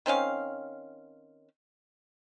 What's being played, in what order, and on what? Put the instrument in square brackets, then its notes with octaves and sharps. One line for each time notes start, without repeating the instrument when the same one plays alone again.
[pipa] D#3 C4 C#4 F5